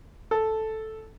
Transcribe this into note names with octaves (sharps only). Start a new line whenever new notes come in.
A4